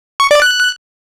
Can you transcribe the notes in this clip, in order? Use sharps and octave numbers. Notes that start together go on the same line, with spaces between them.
C#6
D5
F#6